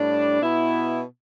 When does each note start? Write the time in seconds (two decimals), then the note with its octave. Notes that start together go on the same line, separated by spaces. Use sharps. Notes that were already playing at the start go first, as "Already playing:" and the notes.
Already playing: A2 G3 D4
0.41 B2 B3 E4